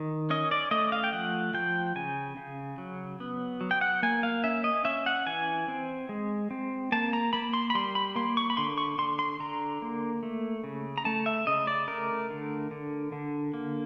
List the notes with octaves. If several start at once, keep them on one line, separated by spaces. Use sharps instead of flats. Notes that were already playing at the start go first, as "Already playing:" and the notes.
Already playing: D#3
C#4 D#5
D5
A3 D#5
F5
G5
F3 F#5
F3 G5
C#3 G#5
C#3
F#3
B3
F#3
G5
F#5
A#3 G#5
F5
C#4 E5
D#5
C#4 E5
F#5
E3 G#5
C4
G#3
C4
A#3 A5
A#5
A#3 B5
C6
B5
G3 C6
B5
A#3 C6
C#6
B5
D3 C6
C#6
D3 C6
C6
D3 A#5
A#3
A3
C#3
A#5
A3 A5
E5
C#3 D#5
D5
A3 A#4
D3
D3
D3
A#3